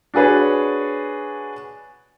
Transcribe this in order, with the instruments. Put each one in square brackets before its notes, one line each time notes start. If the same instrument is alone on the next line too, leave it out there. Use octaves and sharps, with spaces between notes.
[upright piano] D4 F#4 G#4 B4 C#5